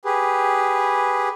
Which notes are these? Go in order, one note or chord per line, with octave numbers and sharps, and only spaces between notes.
G4 G#4 B4